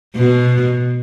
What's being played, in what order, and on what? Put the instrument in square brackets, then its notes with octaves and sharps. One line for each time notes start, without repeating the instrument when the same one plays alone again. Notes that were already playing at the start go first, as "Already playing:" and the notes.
[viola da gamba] B2